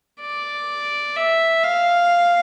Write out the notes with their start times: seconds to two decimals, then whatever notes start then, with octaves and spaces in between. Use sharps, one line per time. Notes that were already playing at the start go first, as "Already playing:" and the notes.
0.21 D5
1.16 E5
1.63 F5